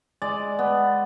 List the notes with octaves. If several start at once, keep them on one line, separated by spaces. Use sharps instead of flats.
G#3 D5
B3